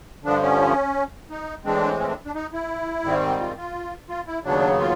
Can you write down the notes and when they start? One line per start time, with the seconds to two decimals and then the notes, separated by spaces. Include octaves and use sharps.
0.25 G2 D3 F3 D4
0.43 C#4
1.30 D#4
1.65 A2 E3 G#3 C4 D4
2.00 C#4
2.08 D4
2.25 D4
2.35 D#4
2.53 E4
3.04 G#2 D#3 G3 C4
3.40 F4
3.57 F4
4.09 F4
4.27 E4
4.44 D#2 C#3 F#3 B3 D4
4.80 F4